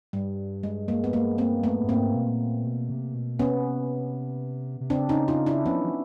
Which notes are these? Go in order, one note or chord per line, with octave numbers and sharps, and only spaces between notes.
G2 G3
G#3
G#3 A#3
B3
G#3 A#3
A#3 C4
A3 B3
G2
G#2 A#3 C4
B2
A#2
B2
C3
B2
C3 B3 C#4
C3
C#3 C4 D4
C#4 D#4
D#4 F4
D4 E4
F3 B3 C#4
F3